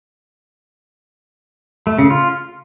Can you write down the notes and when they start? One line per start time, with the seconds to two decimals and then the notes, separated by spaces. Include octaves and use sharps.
1.87 A3
1.98 C#3
2.10 F4